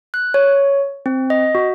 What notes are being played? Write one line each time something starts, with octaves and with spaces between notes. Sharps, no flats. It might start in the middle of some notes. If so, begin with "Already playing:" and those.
F#6
C#5
C4
D#5
F#4